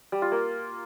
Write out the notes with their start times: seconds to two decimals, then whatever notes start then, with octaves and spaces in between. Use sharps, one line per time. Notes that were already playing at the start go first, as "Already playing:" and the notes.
0.12 G3
0.22 F4
0.32 A#3